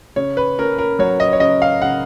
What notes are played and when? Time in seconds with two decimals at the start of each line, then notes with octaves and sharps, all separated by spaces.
0.16 C#3 C#5
0.37 B4
0.58 C#4 A#4
0.78 A#4
0.99 F#3 C#5
1.20 D#5
1.33 C#5
1.40 C#3 D#5
1.62 F5
1.82 C#3 F#5